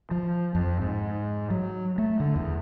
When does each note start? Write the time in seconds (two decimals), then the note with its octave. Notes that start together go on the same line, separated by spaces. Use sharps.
0.11 F3
0.55 F2
0.81 G#2
1.50 F#3
1.98 A3
2.20 D3
2.36 E2